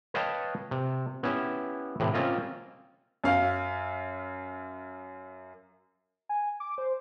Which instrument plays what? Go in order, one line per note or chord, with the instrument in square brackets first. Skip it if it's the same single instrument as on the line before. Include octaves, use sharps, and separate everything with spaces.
[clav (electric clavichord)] B4 C#5 D#5 F5 G5 A5
C3
B3 C#4 E4 G4
A2 C3 E3
A#3 C4 C#4 F4 D#5
[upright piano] F#2 F5
[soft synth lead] G#5
D6
C5